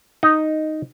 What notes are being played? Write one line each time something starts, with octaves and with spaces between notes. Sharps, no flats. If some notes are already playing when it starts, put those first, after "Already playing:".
D#4